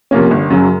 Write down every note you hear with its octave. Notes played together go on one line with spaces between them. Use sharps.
C3 F3 A#3 C#4
G1
F#2 C#3 F#3